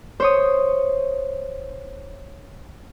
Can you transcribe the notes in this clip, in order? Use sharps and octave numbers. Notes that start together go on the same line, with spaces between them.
C5 C#5 D#6